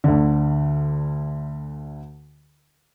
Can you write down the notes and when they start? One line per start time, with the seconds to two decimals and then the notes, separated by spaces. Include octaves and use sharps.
0.04 D2 D3